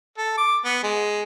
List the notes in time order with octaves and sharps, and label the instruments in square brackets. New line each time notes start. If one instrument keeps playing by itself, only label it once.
[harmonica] A4
D6
B3
G#3